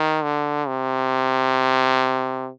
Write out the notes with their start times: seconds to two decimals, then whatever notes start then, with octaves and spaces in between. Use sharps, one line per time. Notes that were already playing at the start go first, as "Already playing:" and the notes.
Already playing: D#3
0.23 D3
0.68 C3